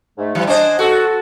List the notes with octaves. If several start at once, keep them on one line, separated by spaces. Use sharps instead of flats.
G#2 A3
E3 G3
D4 C5 D#5 G#5
F#4 A4